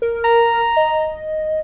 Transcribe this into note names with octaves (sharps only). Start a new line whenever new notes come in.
A#4
A#5
D#5